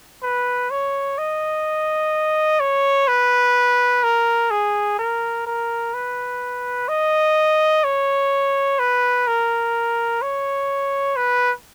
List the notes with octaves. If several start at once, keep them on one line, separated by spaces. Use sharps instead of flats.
B4
C#5
D#5
C#5
B4
A#4
G#4
A#4
A#4
B4
D#5
C#5
B4
A#4
C#5
B4